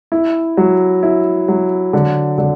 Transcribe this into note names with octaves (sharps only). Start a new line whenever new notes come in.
E4
F#3
E4
F#3
D3
D3